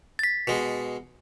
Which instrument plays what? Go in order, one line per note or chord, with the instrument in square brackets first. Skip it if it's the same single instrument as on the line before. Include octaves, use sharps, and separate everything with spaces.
[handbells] A6 B6
[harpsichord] B2 G#3